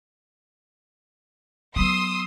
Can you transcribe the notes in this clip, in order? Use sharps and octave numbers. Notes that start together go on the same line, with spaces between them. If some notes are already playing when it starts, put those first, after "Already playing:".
F#3 B3 C6 D#6 E6